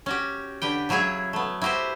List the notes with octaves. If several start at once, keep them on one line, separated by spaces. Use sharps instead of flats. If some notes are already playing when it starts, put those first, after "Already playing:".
C#4 F#4 G4
D3 G4 B4 G5
C#3 F#3 E4 G#4 C#5
A3 B3
E4 F#4 G4 B4 C5